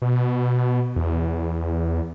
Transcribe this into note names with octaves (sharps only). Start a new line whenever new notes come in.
B2
E2